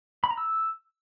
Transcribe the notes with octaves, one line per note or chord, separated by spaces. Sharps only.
B5
A#5
E6